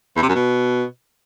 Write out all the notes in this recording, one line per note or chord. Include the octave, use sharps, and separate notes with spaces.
E2
C3
F#2
B2